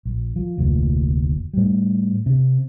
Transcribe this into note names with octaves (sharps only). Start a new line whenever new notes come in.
A#1
F3
F1 D2 A#2
A2 G3
C3